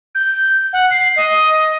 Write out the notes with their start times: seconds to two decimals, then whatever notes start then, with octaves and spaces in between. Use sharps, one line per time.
0.15 G6
0.73 F#5
0.91 C7
1.16 D#5